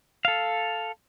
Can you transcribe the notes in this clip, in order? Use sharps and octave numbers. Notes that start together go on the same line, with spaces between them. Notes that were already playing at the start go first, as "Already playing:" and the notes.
A4 F5